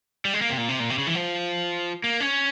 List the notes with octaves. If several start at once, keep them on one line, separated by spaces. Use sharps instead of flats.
G3
G#3
A#3
C3
A#2
C3
A#2
C3
C#3
E3
F3
A#3
C#4